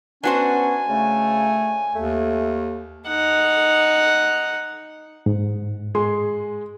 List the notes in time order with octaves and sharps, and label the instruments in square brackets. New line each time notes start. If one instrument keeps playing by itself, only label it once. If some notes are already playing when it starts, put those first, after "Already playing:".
[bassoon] B3 [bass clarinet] C#4 [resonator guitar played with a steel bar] D4 F#4 C5 [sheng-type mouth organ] G#5
[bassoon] C#3 [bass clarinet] A3
[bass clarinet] D#2 [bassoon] A3
[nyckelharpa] D#4 F#5
[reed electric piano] G#2
[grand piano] G#3 G#4 C6